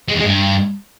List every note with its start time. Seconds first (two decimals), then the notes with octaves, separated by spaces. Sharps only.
0.09 G#3
0.14 E2
0.20 G#3
0.25 G2